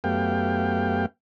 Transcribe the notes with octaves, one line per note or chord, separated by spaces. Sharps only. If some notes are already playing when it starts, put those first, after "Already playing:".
F#2 A3 B3 G4 F5 G5